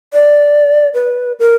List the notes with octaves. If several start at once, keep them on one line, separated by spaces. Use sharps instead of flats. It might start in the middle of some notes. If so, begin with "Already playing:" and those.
D5
B4
A#4